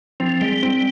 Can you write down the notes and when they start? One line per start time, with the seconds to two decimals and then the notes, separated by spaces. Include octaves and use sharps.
0.20 F3 C4
0.41 G3 G#3
0.63 C4